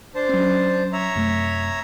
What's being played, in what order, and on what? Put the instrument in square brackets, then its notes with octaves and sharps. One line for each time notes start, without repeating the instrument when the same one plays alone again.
[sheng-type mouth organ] D4 C5 A5
[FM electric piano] F#3 C#4
[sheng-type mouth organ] C#5 E5 A#5
[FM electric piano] F#2 C3 A3